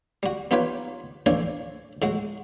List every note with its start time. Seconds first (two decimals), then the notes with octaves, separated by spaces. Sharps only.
0.23 G3 F#4
0.51 B3 D#4 F4 G4 B4 C#5
1.26 A2 E3 F3 D4 C#5
2.02 A2 G#3 F#4